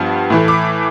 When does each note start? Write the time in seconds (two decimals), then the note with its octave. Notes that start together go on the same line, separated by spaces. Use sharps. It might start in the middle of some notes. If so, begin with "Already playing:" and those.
Already playing: G2 F3 B3
0.30 A2 E3 A3
0.48 D6